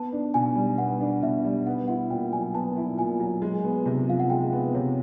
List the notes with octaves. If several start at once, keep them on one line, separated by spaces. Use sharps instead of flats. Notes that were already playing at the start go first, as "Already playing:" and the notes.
Already playing: B3 A5
D4
B2 G#5
G3
B3 F#5
D4
B2 E5
G3
B3 F#5
E4 F#5
A#2 G5
F#3 G#5
B3 A5
E4
A#2 G#5
F#3
G#3
B3
C3
F3 F5
F#5
G#3 G5
B3
C3 C#5